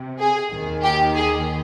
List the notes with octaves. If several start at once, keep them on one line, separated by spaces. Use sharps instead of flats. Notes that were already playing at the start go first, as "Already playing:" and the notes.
Already playing: C3
G#4
D#2 D#3
G4
G#4